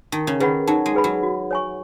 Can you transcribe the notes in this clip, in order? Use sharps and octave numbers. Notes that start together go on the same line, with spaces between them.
D#3 D#4
C#3
D#3 G#4 B4 F#5 B5
F#3 D#4
G#3
G#4 B4 F#5 B5
F#3
F#4
C#5 G#5 C#6